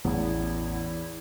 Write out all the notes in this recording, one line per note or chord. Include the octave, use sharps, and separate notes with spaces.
A1 E2 B3 E4